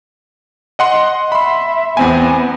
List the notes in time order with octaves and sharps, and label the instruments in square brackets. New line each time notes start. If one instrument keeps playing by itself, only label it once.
[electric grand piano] D#5 F#5 C6
[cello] E5 [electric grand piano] B5 C6
[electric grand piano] E2 C4 G#5 [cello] B3